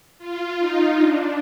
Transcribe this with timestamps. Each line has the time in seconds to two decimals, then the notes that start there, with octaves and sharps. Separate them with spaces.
0.18 F4
0.60 D#4
0.99 D4